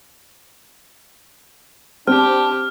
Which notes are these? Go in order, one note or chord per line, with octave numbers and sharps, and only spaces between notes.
C4 D4 G4 A5 F6